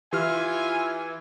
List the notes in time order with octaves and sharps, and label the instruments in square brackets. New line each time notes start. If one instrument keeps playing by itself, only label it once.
[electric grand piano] E3 [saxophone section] F4 E5 [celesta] G4 F6 [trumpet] G#5